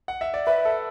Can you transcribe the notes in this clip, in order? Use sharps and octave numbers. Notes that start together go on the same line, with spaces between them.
F#5
E5
D5
B4 E5
A4